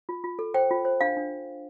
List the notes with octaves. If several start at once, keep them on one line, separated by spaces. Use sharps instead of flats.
F4
F4
A4
C5 G5
F4
C5
D4 F5
D4